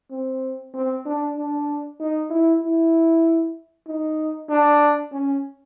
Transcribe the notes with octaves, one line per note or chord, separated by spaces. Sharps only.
C4
C4
D4
D4
D#4
E4
E4
D#4
D4
C#4